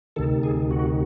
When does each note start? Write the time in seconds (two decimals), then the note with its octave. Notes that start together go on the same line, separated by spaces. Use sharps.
0.16 D2 C3 D#3 A4
0.43 G#4
0.71 F#4